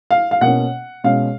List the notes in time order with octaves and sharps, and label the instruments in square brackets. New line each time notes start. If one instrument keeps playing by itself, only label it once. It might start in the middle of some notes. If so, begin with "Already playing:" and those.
[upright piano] F5
F5
B2 A#3 C#4 F#5
B2 G#3 C#4 F5